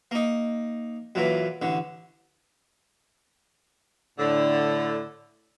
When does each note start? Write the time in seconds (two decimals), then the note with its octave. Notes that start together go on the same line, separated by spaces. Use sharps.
0.11 A#3 D#4
1.15 F#2 A#2 E3
1.62 A1 D3
4.18 A2 D3